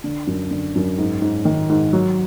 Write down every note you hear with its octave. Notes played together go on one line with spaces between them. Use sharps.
D3
F#2
D3
F#2
G#2
G#2
D#3
G#2
F#3